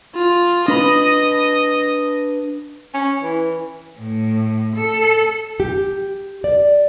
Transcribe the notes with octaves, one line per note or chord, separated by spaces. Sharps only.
F4
D4 B4 D#5 B5
C#4
E3
A2
A4
G4
D5